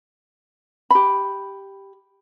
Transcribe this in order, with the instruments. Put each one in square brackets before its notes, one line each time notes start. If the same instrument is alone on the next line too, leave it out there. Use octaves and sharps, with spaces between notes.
[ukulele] G4 B5